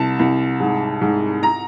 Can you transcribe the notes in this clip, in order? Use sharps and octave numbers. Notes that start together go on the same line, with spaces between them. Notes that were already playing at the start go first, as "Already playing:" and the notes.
Already playing: C2 A5
C2
G#2
G#2
A#5